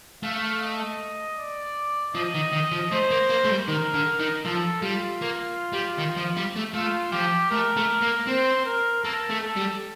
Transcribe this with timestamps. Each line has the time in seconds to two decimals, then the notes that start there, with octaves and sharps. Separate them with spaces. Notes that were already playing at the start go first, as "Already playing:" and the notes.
0.23 A3 F5
0.62 D#5
1.38 D5
2.15 F3 D#5
2.34 D#3
2.52 D#3 D#5
2.71 F3
2.92 A3 C5
3.11 A#3
3.30 A#3
3.44 A3
3.49 G3
3.68 D#3 A#4
3.94 D3
4.20 D#3
4.45 F3 A4
4.82 G3 F4
5.22 A#3
5.73 G3
5.98 D#3
6.16 F3
6.37 G3
6.56 A3
6.74 A3 F4
7.12 F3 G4
7.51 A3 A#4
7.77 A3
8.02 A#3
8.27 C4 C5
8.65 A#4
9.04 A#3 A4
9.30 A3
9.43 A4
9.56 G3